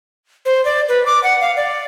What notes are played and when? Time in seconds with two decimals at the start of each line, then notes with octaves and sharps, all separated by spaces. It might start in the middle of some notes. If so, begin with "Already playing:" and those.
0.45 C5
0.65 D5
0.88 B4
1.06 D6
1.23 F#5
1.41 F5
1.56 D5